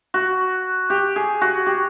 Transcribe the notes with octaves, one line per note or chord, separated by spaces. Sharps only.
F#4
G4
G#4
F#4
G4